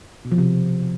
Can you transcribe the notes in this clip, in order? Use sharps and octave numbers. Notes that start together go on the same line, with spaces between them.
B2
F3
C3